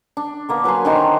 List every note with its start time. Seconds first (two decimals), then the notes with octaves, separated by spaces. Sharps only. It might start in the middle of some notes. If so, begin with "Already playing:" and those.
0.17 D4
0.49 D3 A#3 B3
0.64 F#3 B4 G#5 C6
0.85 D3 D#3 C5 A#5